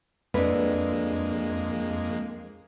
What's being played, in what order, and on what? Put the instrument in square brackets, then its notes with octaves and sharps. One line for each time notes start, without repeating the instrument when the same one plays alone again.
[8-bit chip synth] F2 G#3 A#3 [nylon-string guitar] D4 A4 B4